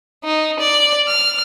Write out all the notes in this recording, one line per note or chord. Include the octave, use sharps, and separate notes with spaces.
D#4
D5
F6